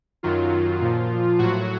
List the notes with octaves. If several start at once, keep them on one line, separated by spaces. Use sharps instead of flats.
F#2 D#3 F#3 F4
A#2 F3
A2 F#3 F#4